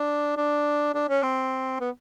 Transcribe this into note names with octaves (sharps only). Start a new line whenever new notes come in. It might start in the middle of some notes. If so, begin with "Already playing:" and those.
Already playing: D4
D4
D4
C#4
C4
B3